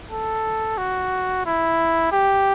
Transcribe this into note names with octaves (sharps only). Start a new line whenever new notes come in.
A4
F#4
E4
G4